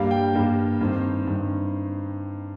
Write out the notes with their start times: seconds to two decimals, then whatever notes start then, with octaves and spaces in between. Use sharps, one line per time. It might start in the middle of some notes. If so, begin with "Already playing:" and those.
Already playing: G2 G3 A#3 F5
0.11 G5
0.33 G2 G3 A#3
0.81 G2 D#3 C4
1.27 G2 D#3 C4